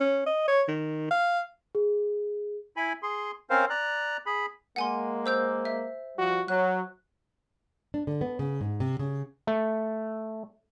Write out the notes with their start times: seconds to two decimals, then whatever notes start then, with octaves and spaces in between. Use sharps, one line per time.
0.01 C#4
0.27 D#5
0.48 C#5
0.68 D#3
1.11 F5
1.75 G#4
2.77 E4 G#5 B5
3.03 G#4 C6
3.50 C4 C#4 A#4 C5 F5
3.70 D5 A#5 F#6
4.26 G#4 B5
4.76 G#3 A#3 F#5 G#5 C6
5.26 C5 E6 G6
5.65 E5
6.18 F3 G3 F#4
6.48 F#3 F#6
7.94 D4
8.07 D3
8.21 B3
8.39 C#3
8.61 G#2
8.80 C3
8.99 C#3
9.47 A3